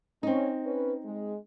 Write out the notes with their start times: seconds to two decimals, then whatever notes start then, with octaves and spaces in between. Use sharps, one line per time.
0.23 C4 C#4 D#4
0.65 C#4 B4
1.05 G#3